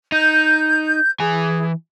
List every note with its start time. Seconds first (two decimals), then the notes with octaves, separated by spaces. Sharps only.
0.12 D#4 G6
1.20 E3 G#4 G#5